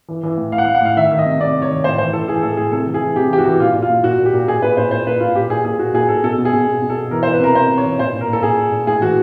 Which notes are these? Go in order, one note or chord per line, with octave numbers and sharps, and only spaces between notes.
E3
E3
A2
A2 F5
F#5
F5
A2
F#5
A2 F5
D#3 E5
D#3
D#5
C3
C3 D5
C3
C#5
D#3
A2 C5
E3 C5
E3 A4
E3 G#4
A2 A4
A2 G#4
C3 A4
E3
G#4
E3
C3 G4
E3 G4
F#4
E3
A#2 F4
A#2
F4
A#2
A#2 F#4
A#2
G4
A#2
A#2 G#4
A#2 B4
A#2 C5
A#2 C5
A#2 B4
A#2 F4
A#2 G4
A#2 G#4
A#2 G#4
A#2 F#4
A#2 G#4
A#2 A4
B2 A4
B2
G#4
B2
B2
B2
A4
B2
E3 A#4
C5
E3
B4
C3 A#4
C3 C5
C3
C#5
E3
A#2 C5
A#2
A#4
A#2
A4
A#2 G#4
A#2
A#2
A2 G#4
E3 F#4